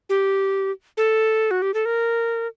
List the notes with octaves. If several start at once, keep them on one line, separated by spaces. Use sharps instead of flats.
G4
A4
F#4
G4
A4
A#4